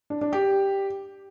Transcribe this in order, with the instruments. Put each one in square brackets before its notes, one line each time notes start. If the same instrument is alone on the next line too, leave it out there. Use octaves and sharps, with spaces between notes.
[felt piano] D4
D4
G4